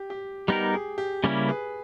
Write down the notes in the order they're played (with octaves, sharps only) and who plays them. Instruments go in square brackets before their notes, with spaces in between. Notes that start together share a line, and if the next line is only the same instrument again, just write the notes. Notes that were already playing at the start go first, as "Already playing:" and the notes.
Already playing: [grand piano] G4
G4
[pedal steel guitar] G3 B3 D#4 A#4 [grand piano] G4
[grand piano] G#4
G4
[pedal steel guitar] C#3 G3 A#3 C#4 E4
[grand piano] G#4 B4